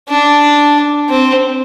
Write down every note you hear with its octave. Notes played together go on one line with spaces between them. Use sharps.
D4
C4